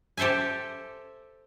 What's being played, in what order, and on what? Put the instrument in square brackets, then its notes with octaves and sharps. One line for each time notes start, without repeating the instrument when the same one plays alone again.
[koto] G4 A4 C5 E5 G#5